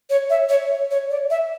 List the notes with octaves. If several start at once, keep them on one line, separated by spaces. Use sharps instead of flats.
C#5
E5
C#5
C#5
D5
E5